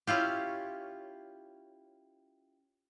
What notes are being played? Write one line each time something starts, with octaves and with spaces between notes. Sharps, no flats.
C#4 E4 F4 G4